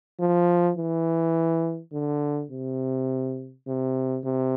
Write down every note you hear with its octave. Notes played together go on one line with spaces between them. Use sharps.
F3
E3
D3
C3
C3
C3